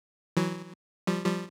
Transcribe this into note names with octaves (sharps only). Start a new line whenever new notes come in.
E3 F#3
F3 G3
F3 G3